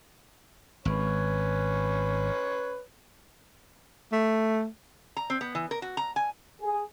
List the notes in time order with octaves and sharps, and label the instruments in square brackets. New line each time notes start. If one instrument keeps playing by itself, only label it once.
[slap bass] G#1 [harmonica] C#4 B4 C#5
[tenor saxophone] A3
[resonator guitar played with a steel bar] A#5
C4
B3
E3
A#4
F#4
A#5
G#5
[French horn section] G#4